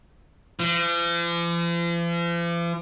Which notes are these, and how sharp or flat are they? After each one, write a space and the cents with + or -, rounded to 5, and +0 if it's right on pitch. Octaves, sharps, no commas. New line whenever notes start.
F3 -45